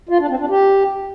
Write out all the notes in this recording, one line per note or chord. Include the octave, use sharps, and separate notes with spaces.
F4
D4
C4
D4
G4